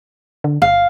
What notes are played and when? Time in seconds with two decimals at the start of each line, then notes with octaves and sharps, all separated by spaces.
0.44 D3
0.62 G1 F5